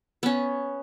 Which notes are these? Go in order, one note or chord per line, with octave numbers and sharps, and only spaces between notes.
B3 C#4